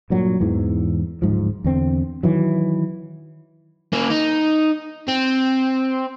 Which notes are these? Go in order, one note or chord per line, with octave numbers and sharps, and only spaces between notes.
G2 A#2 F#3
E2 G#2 E3
D1 G#2 F3
E2 D3 C4
D#3 E3 F#3
A#3 C#4
D#4
C4